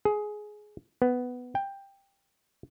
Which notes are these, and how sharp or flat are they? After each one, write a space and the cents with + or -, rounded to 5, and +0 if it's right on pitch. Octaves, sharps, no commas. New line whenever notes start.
G#4 +15
B3 +5
G5 +10